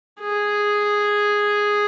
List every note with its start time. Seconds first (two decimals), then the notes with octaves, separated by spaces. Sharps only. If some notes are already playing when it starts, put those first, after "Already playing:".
0.21 G#4